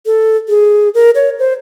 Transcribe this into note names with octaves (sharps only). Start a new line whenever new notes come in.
A4
G#4
A#4
C#5
C5